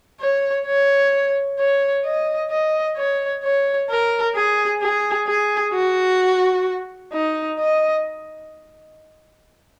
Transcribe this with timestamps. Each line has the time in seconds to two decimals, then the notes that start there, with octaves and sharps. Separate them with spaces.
0.21 C#5
0.67 C#5
1.59 C#5
2.05 D#5
2.51 D#5
2.97 C#5
3.44 C#5
3.90 A#4
4.35 G#4
4.82 G#4
5.28 G#4
5.74 F#4
7.13 D#4
7.59 D#5